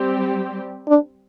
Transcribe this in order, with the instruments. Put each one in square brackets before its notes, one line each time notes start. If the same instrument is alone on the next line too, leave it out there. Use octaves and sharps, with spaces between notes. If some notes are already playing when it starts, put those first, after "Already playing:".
Already playing: [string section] G3 C4 G4
[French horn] D4